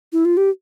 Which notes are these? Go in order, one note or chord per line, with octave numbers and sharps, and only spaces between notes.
E4
F4
G4